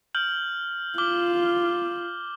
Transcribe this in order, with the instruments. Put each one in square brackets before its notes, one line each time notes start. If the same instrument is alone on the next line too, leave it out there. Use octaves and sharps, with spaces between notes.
[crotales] F6 G6 F#7
[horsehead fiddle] F4 [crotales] D6 F6 G7